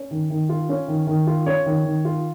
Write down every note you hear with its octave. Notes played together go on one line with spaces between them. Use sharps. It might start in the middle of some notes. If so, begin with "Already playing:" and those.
Already playing: C#4
D#3
D#3
F4
C#4
D#3
D#3
F4
C#4 C#5
D#3
D#3
F4